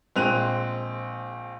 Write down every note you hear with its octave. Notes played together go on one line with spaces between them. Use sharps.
A#1 G#3 C4 F#6 D#7 F7